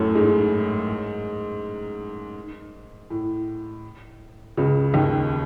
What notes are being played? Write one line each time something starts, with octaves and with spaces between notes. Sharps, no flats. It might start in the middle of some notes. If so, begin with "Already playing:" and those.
Already playing: F#2 A2 F#3 A3
G#2 G#3
A2
C#2 C#3
D#2 D#3